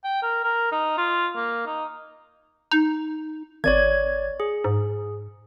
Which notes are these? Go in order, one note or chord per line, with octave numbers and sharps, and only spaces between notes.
G5
A#4
A#4
D#4
F4
A#3
D#4
D#4
G#1 C#5 D5 G#6
G#4
G#2